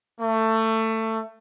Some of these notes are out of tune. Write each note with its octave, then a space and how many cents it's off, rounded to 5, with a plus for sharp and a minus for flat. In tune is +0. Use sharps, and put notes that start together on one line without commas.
A3 +20